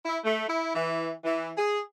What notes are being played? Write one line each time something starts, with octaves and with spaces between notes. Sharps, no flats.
E4
A3
E4
E3
E3
G#4